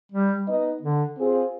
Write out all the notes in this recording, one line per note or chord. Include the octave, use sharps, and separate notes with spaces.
G3
B3 D#4 B4 D#5
D3
C4 F4 G#4 C5